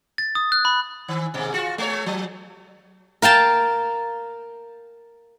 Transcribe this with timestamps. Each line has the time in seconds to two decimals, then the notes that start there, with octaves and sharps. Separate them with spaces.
0.18 A6
0.35 D#6
0.52 F#6
0.65 B5
1.08 D#3
1.34 D#2 G#2 B2
1.54 F4 F#4
1.78 G#3 C#5
2.06 F3
3.22 A#4 F5 G5 A5